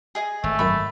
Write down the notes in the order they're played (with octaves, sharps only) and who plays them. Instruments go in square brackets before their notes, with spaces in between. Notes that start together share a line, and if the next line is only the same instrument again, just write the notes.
[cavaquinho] G#4 D#5
[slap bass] G#1 [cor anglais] A3
[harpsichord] F#2 F#3 C#6 [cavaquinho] B5